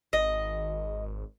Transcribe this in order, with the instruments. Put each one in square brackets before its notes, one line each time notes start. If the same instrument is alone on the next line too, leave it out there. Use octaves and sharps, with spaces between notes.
[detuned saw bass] G#1 [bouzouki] D#5